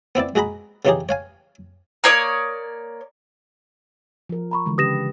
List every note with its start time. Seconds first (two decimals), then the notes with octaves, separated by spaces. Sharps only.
0.15 B3 C4 E4 D5
0.35 G#3 F#4 G#4 A#5 B5
0.85 C#3 E3 C#4 D#4 G4 G#4
1.09 C#5 F5 G#5
2.04 A#3 C#5 D5 D#6
4.29 F3 A#4
4.51 A#5 B5 C#6
4.66 D3 E3 G#3
4.78 C#3 G4 B4 D#6 A#6 E7